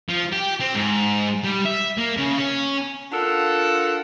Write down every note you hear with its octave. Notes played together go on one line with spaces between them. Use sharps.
F3
G4
C4
G#2
G3
E5
A#3
C#3
C#4
D4 F4 A4 A#4 F5 F#5